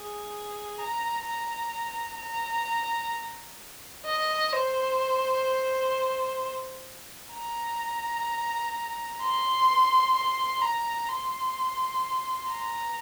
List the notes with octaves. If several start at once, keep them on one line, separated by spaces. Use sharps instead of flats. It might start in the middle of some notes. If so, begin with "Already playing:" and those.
Already playing: G#4
A#5
A#5
A#5
D#5
C5
A#5
C6
C6
A#5
C6
A#5